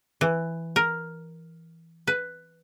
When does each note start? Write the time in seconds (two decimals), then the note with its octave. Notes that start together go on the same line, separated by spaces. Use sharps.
0.21 E3
0.76 A#4
2.07 B4